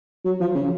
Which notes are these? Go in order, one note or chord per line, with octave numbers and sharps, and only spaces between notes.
F#3
F3
C#3